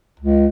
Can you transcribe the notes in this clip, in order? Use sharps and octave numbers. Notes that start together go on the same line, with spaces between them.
C#2